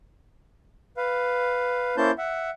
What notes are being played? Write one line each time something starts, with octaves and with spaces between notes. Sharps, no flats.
B4 F5
A#3 C#4 E4 C5 A5 G6
E5 F#5